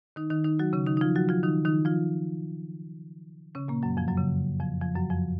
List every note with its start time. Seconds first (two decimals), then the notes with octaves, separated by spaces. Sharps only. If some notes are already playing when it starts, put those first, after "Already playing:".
0.16 D#3 D#4
0.30 D#3 D#4
0.44 D#3 D#4
0.59 F#3 F#4
0.73 C#3 C#4
0.87 D#3 D#4
0.97 D#4
1.01 F3 F4
1.16 F#3 F#4
1.29 F3 F4
1.43 D#3 D#4
1.65 D#3 D#4
1.85 F3 F4
3.55 C#3 C#4
3.68 A#2 A#3
3.83 F#2 F#3
3.97 F2 F3
4.08 F#2 F#3
4.18 C#3
4.60 F2 F3
4.82 F2 F3
4.95 F#2 F#3
5.10 F2 F3